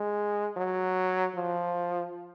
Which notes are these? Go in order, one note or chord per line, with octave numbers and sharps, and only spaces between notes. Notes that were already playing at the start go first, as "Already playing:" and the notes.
Already playing: G#3
F#3
F3